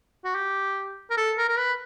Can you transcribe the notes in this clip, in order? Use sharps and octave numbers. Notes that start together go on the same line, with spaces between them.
F#4
G4
A#4
A4
A#4
A#4
B4